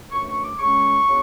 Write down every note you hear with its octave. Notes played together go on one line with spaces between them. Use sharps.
F#2 E3 A3 D4 C#6
C#6
D6
C#3 G#3 C#4 C#6
C#3 F#3 B3 D4